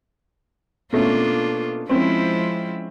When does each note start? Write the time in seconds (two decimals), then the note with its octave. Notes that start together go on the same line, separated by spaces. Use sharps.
0.93 B2 A3 A#3 C#4 D4 F4
1.89 F3 G#3 C4 C#4 E4 C5